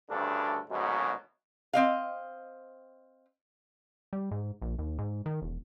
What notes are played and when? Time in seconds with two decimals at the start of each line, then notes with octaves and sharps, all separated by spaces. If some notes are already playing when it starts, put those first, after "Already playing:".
0.10 D2 G2 C#3 D4 A4
0.71 G#1 D2 G#2 B2 F#3
1.73 C4 D#5 F5
4.13 G3
4.31 G#2
4.62 A#1
4.79 D#2
4.98 G#2
5.26 D#3
5.42 E1